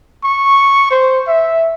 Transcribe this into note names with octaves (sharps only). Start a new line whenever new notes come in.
C#6
C5
E5